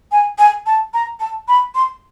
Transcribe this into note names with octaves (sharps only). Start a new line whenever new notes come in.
G#5
G#5
A5
A#5
A5
B5
C6